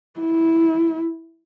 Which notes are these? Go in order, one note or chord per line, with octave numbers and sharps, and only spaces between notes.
E4